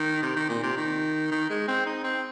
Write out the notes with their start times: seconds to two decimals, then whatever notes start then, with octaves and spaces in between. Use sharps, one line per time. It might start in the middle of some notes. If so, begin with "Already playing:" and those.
Already playing: D#3
0.22 C3
0.36 D#3
0.49 A#2
0.63 C3
0.77 D#3
1.31 D#3
1.50 G#3
1.68 C4
1.86 D#4
2.04 C4